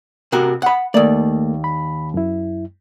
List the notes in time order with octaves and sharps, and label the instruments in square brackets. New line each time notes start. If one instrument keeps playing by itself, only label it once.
[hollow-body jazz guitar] C3 F#4 A#4
F#5 B5
[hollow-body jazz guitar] D#2 D5 [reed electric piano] A3 A#3
[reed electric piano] B5
F#2 E4